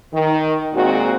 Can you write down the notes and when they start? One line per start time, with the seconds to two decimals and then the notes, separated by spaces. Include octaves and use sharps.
0.13 D#3
0.73 A#2 G#3 C4 F#4